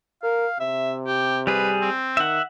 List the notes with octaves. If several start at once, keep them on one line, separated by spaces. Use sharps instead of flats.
A#4 F5
C3 E5
G4
G3 G#4 B4
C4
D#3 E5 F#5